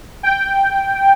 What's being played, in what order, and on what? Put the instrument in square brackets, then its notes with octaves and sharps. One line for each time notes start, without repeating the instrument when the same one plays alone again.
[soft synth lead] G5